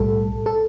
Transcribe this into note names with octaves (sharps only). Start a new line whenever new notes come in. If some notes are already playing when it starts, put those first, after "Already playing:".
Already playing: B1 A2 G3 A4
A4